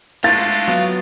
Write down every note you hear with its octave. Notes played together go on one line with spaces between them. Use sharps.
G#3 A3 D4 F4 A6
F#3 B3